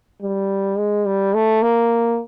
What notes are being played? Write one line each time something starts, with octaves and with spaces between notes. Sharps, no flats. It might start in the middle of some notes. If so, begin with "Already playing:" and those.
G3
G#3
G3
A3
A#3